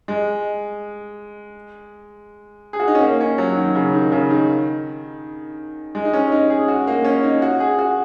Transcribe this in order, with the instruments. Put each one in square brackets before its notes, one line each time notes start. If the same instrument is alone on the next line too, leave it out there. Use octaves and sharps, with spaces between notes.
[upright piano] G#3
G#4
F#4
D#4
C#4
A#3
C#4
F#3
D#3
C#3
D#3
C#3
D#3
G#3
D#4
C#4
D#4
G#4
F#4
A#3
C#4
D#4
F#4
G#4
F#4